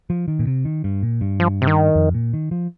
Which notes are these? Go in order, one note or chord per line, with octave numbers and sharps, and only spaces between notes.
F3
D#3
A#2
C3
D#3
G2
A#2
G2
F3
C3
D#3
F2
A#2
D#3
F3